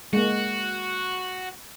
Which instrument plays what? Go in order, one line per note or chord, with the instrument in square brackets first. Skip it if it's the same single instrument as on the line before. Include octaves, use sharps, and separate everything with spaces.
[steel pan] G#3 A#3 [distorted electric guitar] F#4